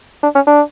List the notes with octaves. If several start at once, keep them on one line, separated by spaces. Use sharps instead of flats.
D4
C#4
D4